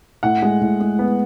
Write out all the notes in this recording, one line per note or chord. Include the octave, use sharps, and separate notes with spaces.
A2 F#5
G#3
A2
G#3
B3